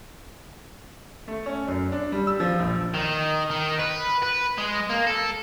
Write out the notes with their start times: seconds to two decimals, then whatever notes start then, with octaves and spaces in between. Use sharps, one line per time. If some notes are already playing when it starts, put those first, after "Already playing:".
1.28 A3
1.46 C#4
1.68 F#2
1.92 D4
2.12 G3
2.27 E6
2.40 F3
2.60 A#1
2.94 D#3
3.50 D#3
3.79 B4
4.22 B4
4.58 G#3
4.90 A#3
5.07 A4